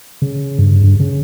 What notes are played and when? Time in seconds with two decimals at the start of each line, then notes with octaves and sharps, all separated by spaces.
0.22 C#3
0.59 G2
0.83 G2
1.00 C#3